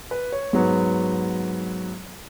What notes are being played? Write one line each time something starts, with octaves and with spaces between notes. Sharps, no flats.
B4
C#5
G#2 F#3 B3